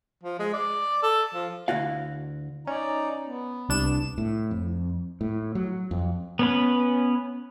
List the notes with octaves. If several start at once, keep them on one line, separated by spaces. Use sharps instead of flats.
F3
G#3
D5
A4
F3
D2 E4 F#4 F5
C#4 D#4 D5 A#5
B3
C2 D4 E7
A2
F2
A2
F#3
F2
B3 C#4 B4